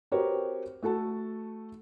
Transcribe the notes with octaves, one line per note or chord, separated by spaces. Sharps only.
C4 F#4 G4 A#4 B4 C#5
A3 F#4 A4 A5